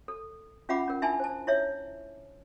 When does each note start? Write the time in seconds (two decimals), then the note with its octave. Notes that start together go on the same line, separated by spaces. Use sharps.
0.08 A4
0.69 C#4 F4 E5 F#5 B5 D6
0.88 C#4 A#4
1.02 D4 E4 E5 G#5 A5 B5
1.20 C5 A5
1.47 E4 C#5 E5